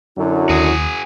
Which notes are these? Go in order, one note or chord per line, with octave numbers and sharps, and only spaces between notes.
F#2 D3 F#3 E4
D#2 F#4 G#4